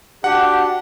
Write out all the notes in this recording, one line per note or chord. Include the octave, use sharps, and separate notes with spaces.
D4 F#4 G4 F#5